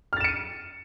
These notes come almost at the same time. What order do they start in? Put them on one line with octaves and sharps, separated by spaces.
F6 A6 E7 C#7 D#7